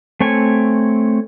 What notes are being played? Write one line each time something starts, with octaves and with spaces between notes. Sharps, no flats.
A3 C4 C#5 G#5